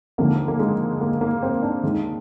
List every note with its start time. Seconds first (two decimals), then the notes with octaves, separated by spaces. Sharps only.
0.18 D#2 D3 F3 G#3 A#3
0.48 A#3
0.59 G#3
1.01 A#3
1.21 A#3
1.43 C4
1.63 D4
1.83 D#2 D#3 G#3